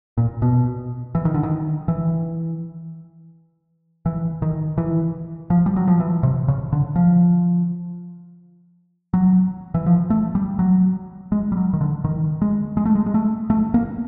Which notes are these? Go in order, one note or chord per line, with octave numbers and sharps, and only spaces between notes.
A#2
B2
E3
D#3
D3
D#3
E3
E3
D#3
E3
F3
G3
F#3
F3
E3
C3
C#3
D3
F3
F#3
E3
F3
A3
G3
F#3
G#3
G3
F#3
D#3
D3
D#3
G#3
G#3
A3
G#3
G#3
A3
A3
A#3